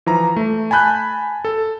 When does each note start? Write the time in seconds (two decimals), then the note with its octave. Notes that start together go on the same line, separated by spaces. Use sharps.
0.06 E3 F3 A#5
0.36 A3
0.71 G#5 A5 B5 F#6 G6
1.45 A4